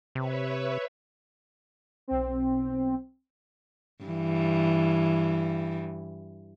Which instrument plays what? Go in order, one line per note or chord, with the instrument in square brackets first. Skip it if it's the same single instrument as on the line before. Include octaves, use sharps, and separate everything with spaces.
[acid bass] C3 [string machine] B4 C#5 E5
[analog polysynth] B1 C4
[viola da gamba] G2 E3